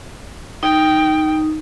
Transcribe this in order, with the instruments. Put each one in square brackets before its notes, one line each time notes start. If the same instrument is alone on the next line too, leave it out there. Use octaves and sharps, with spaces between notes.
[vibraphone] D#4 [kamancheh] G5